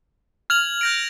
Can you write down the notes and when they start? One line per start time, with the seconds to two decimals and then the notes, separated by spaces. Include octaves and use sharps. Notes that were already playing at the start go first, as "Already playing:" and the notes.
0.50 F6 G#6 F7 F#7
0.81 G6 A#6 D7